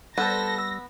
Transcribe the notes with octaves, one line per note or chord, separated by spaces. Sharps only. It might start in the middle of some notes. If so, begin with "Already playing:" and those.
G3 B3 A4 C5 A5 A#6
E6